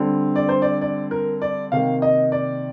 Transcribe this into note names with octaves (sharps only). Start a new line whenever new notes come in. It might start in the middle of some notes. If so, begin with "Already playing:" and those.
Already playing: D3 G3 C4
D5
C5
D5
D5
A#4
D5
C3 D#3 A#3 F5
D#5
D5